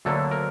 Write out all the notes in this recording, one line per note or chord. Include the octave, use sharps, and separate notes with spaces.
D2 D3 F#3 A#3 A4
A#4